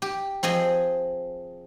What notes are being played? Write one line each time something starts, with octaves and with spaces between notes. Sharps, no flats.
G4
F3 C4 G#4 D#5